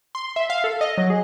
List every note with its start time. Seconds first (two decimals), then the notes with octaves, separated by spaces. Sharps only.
0.15 C6
0.36 E5
0.50 F5
0.64 A4
0.81 D#5
0.98 F#3
1.10 G#4